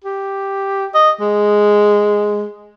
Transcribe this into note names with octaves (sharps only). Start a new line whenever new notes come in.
G4
D#5
G#3